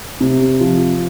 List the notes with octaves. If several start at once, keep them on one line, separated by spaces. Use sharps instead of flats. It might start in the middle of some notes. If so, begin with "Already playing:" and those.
C3
F3